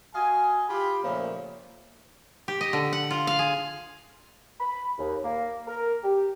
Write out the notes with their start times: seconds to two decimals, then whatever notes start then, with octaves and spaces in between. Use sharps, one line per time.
0.14 F#4 D#5 F5 G#5
0.68 F4 G4 B5
1.03 A#2 C#3 F3 A3 A#3
2.48 G4
2.61 D#5
2.73 D3
2.93 F#5
3.11 F4
3.27 F5
3.39 G#4
4.60 B5
4.98 D#2
5.24 A#3
5.68 A#4
6.04 G4